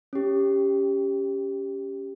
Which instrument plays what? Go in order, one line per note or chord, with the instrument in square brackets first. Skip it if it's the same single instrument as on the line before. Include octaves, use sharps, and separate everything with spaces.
[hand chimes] C#4 G4